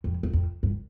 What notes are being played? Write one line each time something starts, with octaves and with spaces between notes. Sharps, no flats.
F2
E2
F2
G2